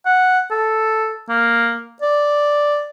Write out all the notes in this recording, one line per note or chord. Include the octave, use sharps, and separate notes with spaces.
F#5
A4
A#3
D5